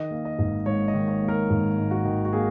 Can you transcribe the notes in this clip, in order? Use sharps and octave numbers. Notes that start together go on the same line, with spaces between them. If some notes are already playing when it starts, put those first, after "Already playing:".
Already playing: D#3 D#5
A#3
D#5
G#1
G#2 C#5
D#5
D#3
C#5
A#3
A#4
G#1
G#2
F#4
D#3
F#4
A#3 G#4